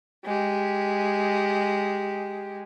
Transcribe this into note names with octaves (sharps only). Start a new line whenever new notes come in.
G#3 G4